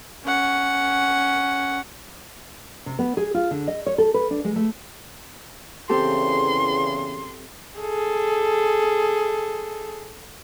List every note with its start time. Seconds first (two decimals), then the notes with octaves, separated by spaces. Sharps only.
0.25 C#4 F#5
2.86 C3
2.99 B3
3.17 G#4
3.34 F4
3.51 D3
3.68 D#5
3.86 C#5
3.98 A4
4.14 B4
4.31 D4
4.44 G#3
4.56 A3
5.89 E2 C#3 C4 G4 A4 C6
7.79 G#4 A4